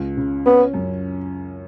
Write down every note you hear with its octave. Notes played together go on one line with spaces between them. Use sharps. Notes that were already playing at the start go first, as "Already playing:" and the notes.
Already playing: C#2
C#3
B3 C#4
F#2